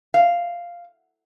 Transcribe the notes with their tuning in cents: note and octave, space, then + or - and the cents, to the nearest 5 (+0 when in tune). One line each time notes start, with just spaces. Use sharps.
F5 -5